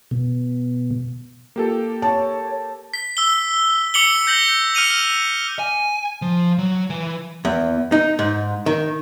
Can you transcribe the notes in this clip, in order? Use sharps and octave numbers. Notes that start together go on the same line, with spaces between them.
B2
A#3 F4 G4 A4
C#5 A5
B6
E6 G7
D6 C#7 F#7 G7
G6 A#6 F#7
F6 C#7 D#7 F7
G#5
F3
F#3
E3
E2
D#4
G#2
D#3